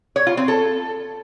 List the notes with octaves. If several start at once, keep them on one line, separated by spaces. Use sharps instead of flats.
C#5
F4
C4
A4